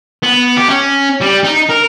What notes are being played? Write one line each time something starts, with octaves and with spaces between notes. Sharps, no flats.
B3
G4
C#4
G3
D#4
A#4